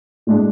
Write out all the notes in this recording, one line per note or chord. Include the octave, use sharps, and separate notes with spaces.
A2 G#3 D4